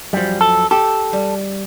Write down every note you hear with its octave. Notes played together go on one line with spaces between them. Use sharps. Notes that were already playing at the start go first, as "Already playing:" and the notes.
F#2 F3 G3
A4
G4 A4
G3